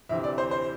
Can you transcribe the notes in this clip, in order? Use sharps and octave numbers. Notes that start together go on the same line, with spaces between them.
D2 C3 E3 E5
D5
C5
C5